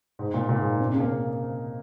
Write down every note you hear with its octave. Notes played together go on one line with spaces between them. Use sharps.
G#2
A#2
A#2
G#2
C3
C#3
A#3
C#4